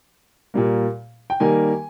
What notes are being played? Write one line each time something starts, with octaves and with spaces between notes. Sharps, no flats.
A#2 G3 A#3
G5
D#3 G3 A#3 G#5